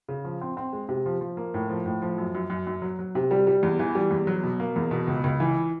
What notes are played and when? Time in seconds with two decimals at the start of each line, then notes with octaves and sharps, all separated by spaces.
0.08 C#3
0.24 F3
0.41 C4
0.57 C4
0.73 G#3
0.89 C3
1.06 F3
1.21 F3
1.37 A#3
1.54 A2
1.69 F3
1.86 A2
2.02 F3
2.18 F#2
2.35 F#2
2.50 F#2
2.67 F#2
2.82 F#3
2.99 F#3
3.15 C3
3.31 G3
3.47 G3
3.63 E2
3.79 E3
3.95 G3
4.11 E2
4.27 F#3
4.43 B2
4.60 A#3
4.76 E2
4.91 B2
5.08 C#2
5.24 C#2
5.40 E3